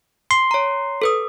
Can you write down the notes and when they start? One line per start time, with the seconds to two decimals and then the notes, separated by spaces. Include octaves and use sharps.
0.31 C6
0.51 C#5 A#5
1.02 A4 B4 D#6